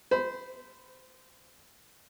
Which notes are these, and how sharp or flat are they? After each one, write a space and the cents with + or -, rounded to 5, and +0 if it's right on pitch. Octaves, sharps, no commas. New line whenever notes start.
C5 -20 B5 +0